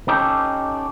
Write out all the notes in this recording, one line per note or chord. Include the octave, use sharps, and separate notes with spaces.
C#4 D#4 G4 A4